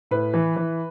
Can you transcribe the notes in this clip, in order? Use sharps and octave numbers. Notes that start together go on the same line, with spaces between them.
A2 B4
E3
E3